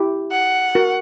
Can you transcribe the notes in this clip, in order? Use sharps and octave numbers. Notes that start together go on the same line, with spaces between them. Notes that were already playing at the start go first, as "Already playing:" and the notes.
Already playing: E4 G4
F#5
F#4 A#4